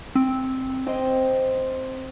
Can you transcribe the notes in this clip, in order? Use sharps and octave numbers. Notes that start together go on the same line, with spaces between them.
C4
C5 D#5 G5